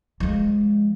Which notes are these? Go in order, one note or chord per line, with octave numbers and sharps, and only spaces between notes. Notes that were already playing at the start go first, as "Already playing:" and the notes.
F3 G#3